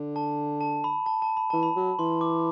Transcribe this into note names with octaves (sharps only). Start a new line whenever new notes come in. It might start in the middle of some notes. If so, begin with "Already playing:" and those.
Already playing: D3
A5
A5
B5
A5
A5
B5
E3 A5
B5
F#3
E3 C6
D6